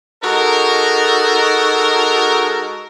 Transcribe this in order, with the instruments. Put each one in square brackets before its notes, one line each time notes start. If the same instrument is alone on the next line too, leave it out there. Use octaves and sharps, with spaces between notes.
[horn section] G#3 D#4 F#4 A4 A#4